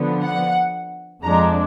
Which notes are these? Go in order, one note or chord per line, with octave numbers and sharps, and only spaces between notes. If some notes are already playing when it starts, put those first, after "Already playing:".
Already playing: D3 F3 B3
F#5
F2 F3 G#3 D4 A#5